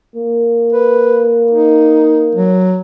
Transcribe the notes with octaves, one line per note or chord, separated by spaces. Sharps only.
A#3
B4
D#4
F#3